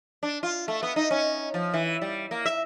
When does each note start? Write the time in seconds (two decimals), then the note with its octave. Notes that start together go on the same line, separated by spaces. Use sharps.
0.23 D4
0.43 F4
0.68 A3
0.83 B3
0.96 D#4
1.11 C#4
1.54 F3
1.74 E3
2.01 G3
2.31 A#3
2.46 E5